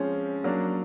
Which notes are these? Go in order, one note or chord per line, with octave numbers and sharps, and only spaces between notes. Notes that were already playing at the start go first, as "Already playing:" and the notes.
Already playing: F3 G#3 C4 C#4
F#3 A#3 D4